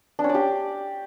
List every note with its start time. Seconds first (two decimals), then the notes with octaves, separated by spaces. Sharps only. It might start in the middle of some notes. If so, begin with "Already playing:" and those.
0.19 D4
0.24 C#4
0.29 D5
0.35 G4